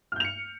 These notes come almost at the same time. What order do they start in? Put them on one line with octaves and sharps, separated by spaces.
F6 G6 F7 C#7